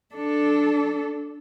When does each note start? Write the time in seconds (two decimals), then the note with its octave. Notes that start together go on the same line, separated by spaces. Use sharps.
0.15 D4 A4